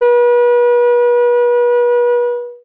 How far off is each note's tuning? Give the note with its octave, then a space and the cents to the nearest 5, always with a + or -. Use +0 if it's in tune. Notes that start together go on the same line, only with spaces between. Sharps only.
B4 -35